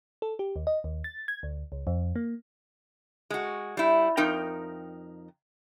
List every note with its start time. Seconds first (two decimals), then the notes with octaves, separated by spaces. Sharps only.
0.22 A4
0.39 G4
0.56 D#2
0.67 D#5
0.84 D#2
1.04 A6
1.28 G#6
1.43 D2
1.72 C#2
1.87 F2
2.16 A#3
3.30 G#3 F#4
3.77 G3 E4
4.17 F2 D#4 A#4 G5